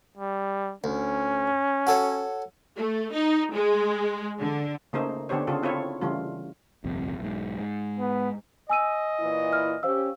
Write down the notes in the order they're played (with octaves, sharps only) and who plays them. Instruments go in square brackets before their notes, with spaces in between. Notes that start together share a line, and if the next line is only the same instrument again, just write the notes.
[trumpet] G3
[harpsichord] D2 [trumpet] C#4
[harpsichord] F#4 A4 C#5
[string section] A3
D#4
G#3
D3
[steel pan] C#3 A3 A#3 D#4 G#4 C5
D3 B3 G4 C5 C#5
C#3 F4 G#4 A4
C4 E4 F4 A4 C#5
C#3 E3 G3 A3 F4
[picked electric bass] G1 C2 F2
B1 G#2
G#2
[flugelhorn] B3
[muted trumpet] D#5 [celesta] G#5 E6 D#7
[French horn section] A#2 E3 E4
[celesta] F6
[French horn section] C#4 G4 [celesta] C5 F5 E6